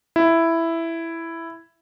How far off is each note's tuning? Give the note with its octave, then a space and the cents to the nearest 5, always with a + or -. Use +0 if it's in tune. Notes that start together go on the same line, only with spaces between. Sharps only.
E4 +5